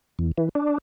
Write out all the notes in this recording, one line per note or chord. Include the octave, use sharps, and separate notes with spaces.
E2
E3
D4